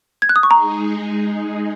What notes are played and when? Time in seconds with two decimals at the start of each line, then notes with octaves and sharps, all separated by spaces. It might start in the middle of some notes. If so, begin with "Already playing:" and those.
0.22 G#6
0.29 F#6
0.36 D#6
0.43 C#6
0.50 G#3 D#4 G#4 A#5